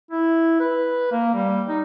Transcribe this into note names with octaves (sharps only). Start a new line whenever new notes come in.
E4
B4
A#3
G3
D#4